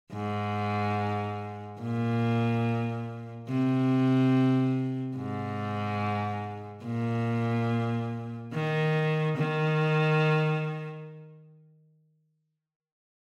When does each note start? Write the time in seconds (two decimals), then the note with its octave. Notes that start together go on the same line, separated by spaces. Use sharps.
0.13 G#2
1.81 A#2
3.49 C3
5.16 G#2
6.85 A#2
8.53 D#3
9.37 D#3